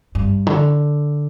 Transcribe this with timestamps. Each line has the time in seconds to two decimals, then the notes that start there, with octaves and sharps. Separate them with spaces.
0.15 G2
0.47 D3